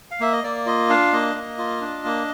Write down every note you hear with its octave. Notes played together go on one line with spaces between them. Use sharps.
F5
A#3 E5
D#5
A#3 D5
F4 D#5
D4 F5
A#3 D#5
A#3
F4
D4
A#3